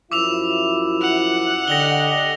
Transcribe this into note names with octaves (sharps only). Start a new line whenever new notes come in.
F#2 F3 E4 D6 E6 F7
F#5
D3 G4 D#5 A#6 F7 G7